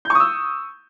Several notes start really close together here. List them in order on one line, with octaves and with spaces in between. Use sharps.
G6 C#6 D#6 E6